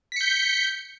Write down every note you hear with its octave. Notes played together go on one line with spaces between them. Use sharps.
G6 B6 C#7